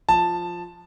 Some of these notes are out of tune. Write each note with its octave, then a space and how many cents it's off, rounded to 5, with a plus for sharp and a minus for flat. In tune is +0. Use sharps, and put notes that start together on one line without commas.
F3 +0 A5 +0